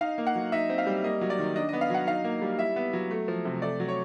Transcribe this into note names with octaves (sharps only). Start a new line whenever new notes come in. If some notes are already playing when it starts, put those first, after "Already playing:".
D#4 F5
A#3
F#5
F#3
D#4 E5
C4
F5
G3
A#3 D#5
F#3
D5
D#3
D4 D#5
D#5
B3
F5
F#3 F#5
D#4 F5
A#3
G3
E4 E5
B3
F#3
A3
F3
C3
A3 D5
F#3
C#5